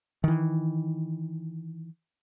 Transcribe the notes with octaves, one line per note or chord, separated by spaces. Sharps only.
D#3 E3